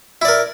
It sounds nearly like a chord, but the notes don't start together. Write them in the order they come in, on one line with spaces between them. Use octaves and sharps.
E4 D5 A#4